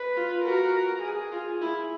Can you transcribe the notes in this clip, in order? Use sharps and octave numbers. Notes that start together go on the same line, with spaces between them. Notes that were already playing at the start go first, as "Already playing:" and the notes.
Already playing: B4
F4
F#4 A#4
G#4
F4
E4